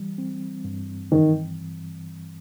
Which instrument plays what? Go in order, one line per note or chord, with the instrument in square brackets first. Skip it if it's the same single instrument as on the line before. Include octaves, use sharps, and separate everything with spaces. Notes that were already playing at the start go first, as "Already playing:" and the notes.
Already playing: [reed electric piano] E3 G3
C4
G2
[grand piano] D#3 [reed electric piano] E3